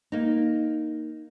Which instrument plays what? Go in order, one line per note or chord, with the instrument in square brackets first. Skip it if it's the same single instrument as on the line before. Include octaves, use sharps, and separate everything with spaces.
[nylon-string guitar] A#3 D#4